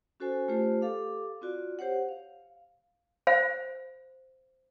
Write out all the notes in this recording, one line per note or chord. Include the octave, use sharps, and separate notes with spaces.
C#4 F#4 A4 C5 G#5
A3 F4 G4 C5
G4 A4 F5 D6
C4 F4 F#4 D5
G4 C5 C#5 F#5
F5
C5 F5